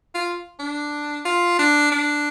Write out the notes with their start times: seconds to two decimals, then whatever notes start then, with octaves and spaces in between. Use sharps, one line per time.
0.15 F4
0.60 D4
1.25 F4
1.59 D4
1.92 D4